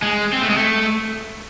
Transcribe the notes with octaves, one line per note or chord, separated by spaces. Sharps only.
G#3
C4
A3
G#3
A3